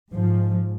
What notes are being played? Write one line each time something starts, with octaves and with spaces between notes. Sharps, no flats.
G#2 F3